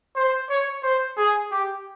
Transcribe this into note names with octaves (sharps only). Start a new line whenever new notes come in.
C5
C#5
C5
G#4
G4